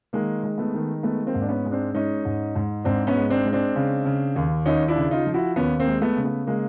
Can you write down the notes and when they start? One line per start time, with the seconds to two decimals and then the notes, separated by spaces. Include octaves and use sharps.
0.13 D#3 G#3 A#3
0.43 G#3
0.58 A3 B3
0.74 D#3
1.03 G#3 A3 B3
1.26 A#3 C4
1.34 G#2
1.41 D4
1.49 B3 C#4
1.65 G#3
1.71 C4 D4
1.94 G#3 C#4 D#4
2.25 G#2
2.55 G#2
2.84 G#2 C4 D4
3.07 B3 C#4
3.15 G#3
3.30 C4 D4
3.45 G#3
3.53 C4 D4
3.76 C#3
4.05 C#3
4.36 D#2
4.66 D#2 C#4 D#4
4.88 D4 E4
4.96 C#3
5.11 D#4 F4
5.26 F3
5.34 E4 F#4
5.56 D#2 B3 C#4
5.80 A#3 C4
5.87 G#3
6.01 A3 B3
6.17 C#3
6.24 A3 B3
6.47 C#3 G#3 A#3